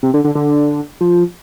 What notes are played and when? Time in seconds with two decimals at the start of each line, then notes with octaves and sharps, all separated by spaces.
0.03 C3
0.14 D3
0.24 D3
0.35 D3
1.01 F3